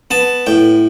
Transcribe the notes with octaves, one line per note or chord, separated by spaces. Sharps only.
B3 A5
A2 G5